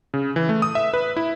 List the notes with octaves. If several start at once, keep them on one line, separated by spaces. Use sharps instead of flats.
C#3
E3
A3
D#6
E5
B4
E4